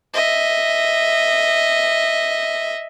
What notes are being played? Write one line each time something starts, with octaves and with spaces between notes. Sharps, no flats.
D#5 E5